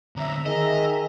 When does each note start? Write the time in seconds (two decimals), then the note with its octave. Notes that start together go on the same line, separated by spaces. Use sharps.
0.16 D3 C4 E5 A#5
0.46 D#3 G#4 D#5